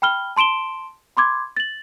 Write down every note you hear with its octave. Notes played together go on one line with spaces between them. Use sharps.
G5 B5 F6 G7
A5 C6 D7 E7 G7
B5 C6 D6 G#6
A6 F#7